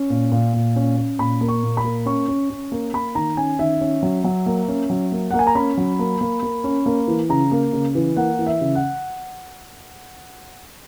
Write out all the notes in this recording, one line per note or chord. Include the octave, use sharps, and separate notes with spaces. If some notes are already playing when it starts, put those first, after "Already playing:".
Already playing: C#4
A#2
A#2
A#2
C#4
C#4
A#2 B5
A#3
C#6
A#2
B5
A#3
C#4 C#6
C#4
C#4
A#3
A#3 B5
D#3 A#5
C#4 G#5
D#3 E5
C#4
F#3
F#3
A#3
C#4
F#3
A#3
A#3 F#5
G#5
A#5
C#4 B5
F#3
A#3
A#3
A#3
C#4
A#3
E3
C#3 A#5
A#3
C#3
E3
A#3 F#5
E3
E5
C#3
F#5